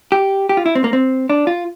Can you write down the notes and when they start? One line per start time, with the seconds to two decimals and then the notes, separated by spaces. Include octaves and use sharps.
0.12 G4
0.49 G4
0.57 F4
0.66 E4
0.75 C4
0.84 A#3
0.93 C4
1.30 D4
1.47 F4